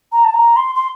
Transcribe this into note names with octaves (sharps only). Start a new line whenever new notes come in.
A#5
A5
A#5
C6
C6